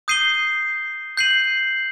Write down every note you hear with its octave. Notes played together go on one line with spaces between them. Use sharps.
D#6 G6 C7 D#7 G7
G6 C7 D#7 F#7